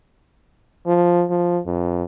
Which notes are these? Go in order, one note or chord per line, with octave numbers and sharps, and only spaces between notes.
F3
F3
F2